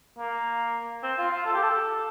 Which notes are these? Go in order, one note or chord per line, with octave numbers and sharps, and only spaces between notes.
A#3
C4
F4
F4
A4
G4
A4